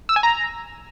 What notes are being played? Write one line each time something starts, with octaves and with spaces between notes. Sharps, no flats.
E6
G#5
A#5